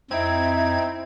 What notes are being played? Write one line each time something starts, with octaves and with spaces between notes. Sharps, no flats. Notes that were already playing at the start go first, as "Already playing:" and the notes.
F2 C4 D#4 E4 E5 G#6